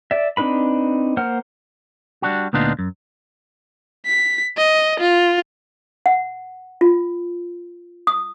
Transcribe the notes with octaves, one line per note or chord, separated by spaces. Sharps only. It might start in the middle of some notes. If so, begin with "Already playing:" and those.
D5 E5
C4 D4 D#4 B4 B5
A#3 C5 F#5 F6
G3 D4 F#4
D2 A#2 B3 D4 D#4 F4
F#2
B6
D#5
F4
F#5
F4
D#6